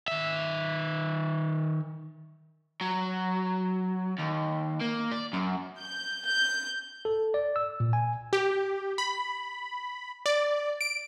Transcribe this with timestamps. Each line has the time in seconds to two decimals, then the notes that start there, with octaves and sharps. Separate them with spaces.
0.08 D#3 E5
2.81 F#3
4.19 D#2
4.81 A#3
5.12 D5
5.33 F#2
5.78 G6
6.25 G6
7.05 A4
7.34 D5
7.56 E6
7.80 A#2
7.93 G#5
8.33 G4
8.98 B5
10.26 D5
10.81 D7